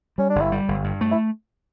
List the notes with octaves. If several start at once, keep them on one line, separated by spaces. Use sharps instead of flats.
G3 C#4
D4
G1
E4
G3
G1
G2
A3
E4